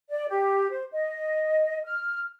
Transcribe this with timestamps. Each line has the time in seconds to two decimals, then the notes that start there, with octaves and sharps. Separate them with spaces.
0.10 D5
0.29 G4
0.70 C5
0.92 D#5
1.84 F6